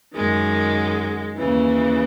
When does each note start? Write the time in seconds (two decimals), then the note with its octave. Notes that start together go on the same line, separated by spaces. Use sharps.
0.14 F#2 D#3 G#3
1.37 D#2 C#3 E3